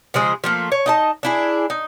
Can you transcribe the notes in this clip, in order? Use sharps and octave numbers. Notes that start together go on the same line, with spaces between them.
C#3 F3 G#3 G#4
F3 A3 A#3
C#5
D#4 D#5 A5
D4 E4 G#4
D#4